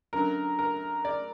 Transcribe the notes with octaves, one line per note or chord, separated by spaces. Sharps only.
F#2 D3 F#3 A#4
A#4
D5